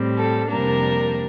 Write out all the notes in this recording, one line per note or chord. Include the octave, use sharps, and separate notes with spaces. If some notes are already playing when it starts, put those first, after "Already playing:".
Already playing: A2 G3 C4
A4
F2 C3 G3 A#3 D4 A#4